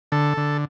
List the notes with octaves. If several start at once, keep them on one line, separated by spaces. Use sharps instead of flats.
D3 A4
D3